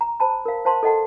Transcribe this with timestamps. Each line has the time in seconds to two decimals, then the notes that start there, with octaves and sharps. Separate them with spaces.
0.01 A#5
0.20 C5 A5 B5
0.46 A#4 F5
0.65 C5 F5 A5 C6
0.83 A4 D#5 F#5 A5